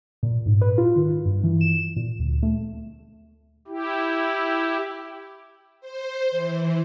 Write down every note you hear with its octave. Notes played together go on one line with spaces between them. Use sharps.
A#2
G#2
B4
F4
D#3
G2
E3
E7
A#2
D2
A3
E4 G4
C5
E3